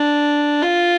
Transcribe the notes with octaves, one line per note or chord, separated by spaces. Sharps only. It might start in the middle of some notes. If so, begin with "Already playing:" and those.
Already playing: D4
F4